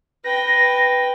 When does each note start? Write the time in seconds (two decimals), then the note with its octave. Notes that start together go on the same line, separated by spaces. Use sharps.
0.24 B4 G5 A#6